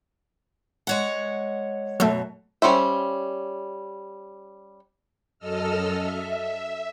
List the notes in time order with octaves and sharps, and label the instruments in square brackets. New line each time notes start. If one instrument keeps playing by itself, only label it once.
[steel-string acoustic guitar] G#3 C#5 F#5
[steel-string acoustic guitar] F#2 B2 [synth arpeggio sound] F#3 A3
[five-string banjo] G3 C#4 C5 E5
[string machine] F#2 A4 D#5 E6 F6
E5